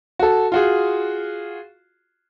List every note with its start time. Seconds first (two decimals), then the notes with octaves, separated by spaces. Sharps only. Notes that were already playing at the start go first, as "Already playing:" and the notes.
0.19 F#4 A4
0.52 F4 F#4 G#4